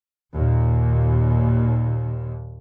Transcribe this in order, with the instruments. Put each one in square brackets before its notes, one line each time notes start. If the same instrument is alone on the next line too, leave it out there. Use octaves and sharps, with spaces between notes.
[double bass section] D#2 A#2